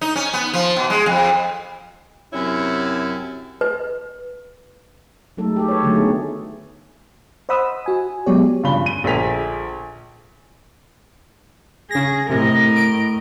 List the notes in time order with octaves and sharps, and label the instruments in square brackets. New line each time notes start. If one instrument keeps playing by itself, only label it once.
[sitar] D#4
C#4
B3
F3
B2
G#3
F2
[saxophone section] F#2 C3 C#4 E4
[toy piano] B4
[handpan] F#3 G#3 A3 D#4 A4
G4 A4
B4 C#5
D3 D#3 F#3 G#3 A3
B3 D#4 G#4
[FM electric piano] C5 D#5 F#5 B5 D#6 E6
F#4 G#5
F#3 G#3 B3 G4 C#5 D5
[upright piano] G2 C#3 F3 B5 G7
D#7
A#1 D3 G#4 A#4 B6 F7
[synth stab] C#3 A#6 [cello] G#4
[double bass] A2 [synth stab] C3 [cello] A#4 D#5
[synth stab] D7